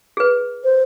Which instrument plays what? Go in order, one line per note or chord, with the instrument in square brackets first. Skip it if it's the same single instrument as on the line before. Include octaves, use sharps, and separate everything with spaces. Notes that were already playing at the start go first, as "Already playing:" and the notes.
[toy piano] G#4 B4
[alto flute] C5